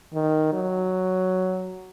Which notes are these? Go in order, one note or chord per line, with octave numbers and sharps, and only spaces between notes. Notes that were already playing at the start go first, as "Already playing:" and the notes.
D#3
F#3